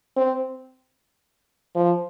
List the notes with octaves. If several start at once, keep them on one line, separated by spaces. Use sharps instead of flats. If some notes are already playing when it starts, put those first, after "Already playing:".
C4
F3